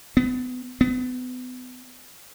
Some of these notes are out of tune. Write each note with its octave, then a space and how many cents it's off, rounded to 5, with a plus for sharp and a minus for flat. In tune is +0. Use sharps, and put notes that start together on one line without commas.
B3 +30
B3 +35